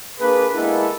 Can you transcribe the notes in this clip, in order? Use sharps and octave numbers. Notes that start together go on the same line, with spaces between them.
A#3 D4 G#4 B4
G#3 A#3 B3 E4 A4